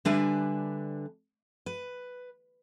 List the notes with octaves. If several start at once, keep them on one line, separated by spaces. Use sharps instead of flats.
D3 G3 D4 B4 E5 G#5
B4